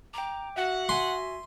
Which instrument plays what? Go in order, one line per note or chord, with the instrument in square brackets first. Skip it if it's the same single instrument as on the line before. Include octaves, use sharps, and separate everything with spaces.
[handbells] G5 D6 [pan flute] A#5
[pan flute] F#4 [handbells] E5 [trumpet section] F#5
[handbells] E5 G#5 B6 [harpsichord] C6